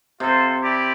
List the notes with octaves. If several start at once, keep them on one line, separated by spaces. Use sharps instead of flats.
C3 F4 A4 C5
E4 G4 D5